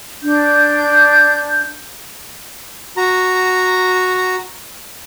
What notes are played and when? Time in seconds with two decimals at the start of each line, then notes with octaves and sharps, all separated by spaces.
0.22 D4 G6
2.97 F#4 A#5